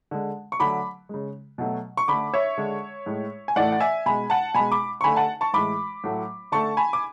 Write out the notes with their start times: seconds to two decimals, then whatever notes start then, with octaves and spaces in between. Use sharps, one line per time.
0.11 D3 G#3
0.52 C#6
0.60 D3 F#3 A3 B5 D6
1.09 C#3 G#3
1.58 B2 F#3 A3
1.97 C#6
2.08 D3 A3 B5 D6
2.34 C#5 E5
2.58 D3 G#3
3.06 A2 G#3
3.48 G#5
3.56 A2 E3 A3 D5 F#5
3.72 F#5
3.80 E5 G#5
4.06 B2 G#3 G#5 B5
4.30 F#5 A5
4.54 B2 G#3 G#5 B5
4.72 B5 D6
5.01 C#6
5.04 D3 A3 G#5 B5
5.16 F#5 A5
5.41 A5 C#6
5.53 A2 E3 G#3 B5 D6
6.04 A2 F#3 A3
6.52 D3 A3 A5 C#6
6.77 G#5 B5
6.93 D6